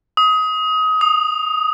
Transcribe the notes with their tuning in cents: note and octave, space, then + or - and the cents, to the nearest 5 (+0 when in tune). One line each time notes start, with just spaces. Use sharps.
D#6 +25
D#6 -15